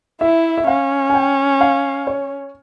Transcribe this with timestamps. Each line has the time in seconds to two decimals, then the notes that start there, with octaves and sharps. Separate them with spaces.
0.21 E4 E5
0.58 E5
0.67 C#4 F5
1.10 G#5
1.14 G5
1.61 F5
2.07 C#5